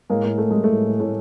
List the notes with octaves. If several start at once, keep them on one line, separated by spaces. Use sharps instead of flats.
A2 G#3 A#3
A2 A#3
A2 A3
G3 G#3
A3
A2
A2
A2 A3